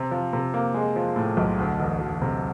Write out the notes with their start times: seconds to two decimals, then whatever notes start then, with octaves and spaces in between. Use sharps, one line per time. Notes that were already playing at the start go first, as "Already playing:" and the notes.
Already playing: C3
0.11 F3
0.33 C3
0.54 A#3
0.74 G#3
0.96 F3
1.16 A2
1.37 B1
1.59 D2
1.79 E1
2.00 E1
2.22 C3